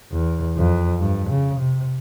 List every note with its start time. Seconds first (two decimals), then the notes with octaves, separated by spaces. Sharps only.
0.12 E2
0.57 F2
1.01 G2
1.31 C#3
1.60 C3